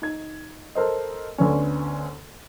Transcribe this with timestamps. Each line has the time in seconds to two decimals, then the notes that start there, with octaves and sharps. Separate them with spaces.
0.02 D#4 G#6
0.75 A4 A#4 C5 D#5
1.38 D2 D3 B3 C#4